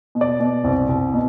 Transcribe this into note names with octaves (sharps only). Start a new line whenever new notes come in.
B2
D5
B2
C2
C2
B2